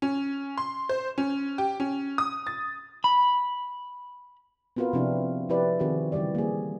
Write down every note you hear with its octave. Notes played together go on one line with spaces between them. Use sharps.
C#4
C6
C5
C#4
G4
C#4
D#6
A6
B5
B3 C4 F4 F#4 A#4 B4
C3 F3 C4 D4 E4
F3 E4 G4 B4 D5
D#3 C4 F#4 G#4
C#3 E3 G3 G4 D5
A#3 G#4